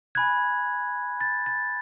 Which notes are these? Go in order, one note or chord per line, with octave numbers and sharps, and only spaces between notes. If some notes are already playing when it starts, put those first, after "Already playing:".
G#5 B5 F#6 G#6
A6
A6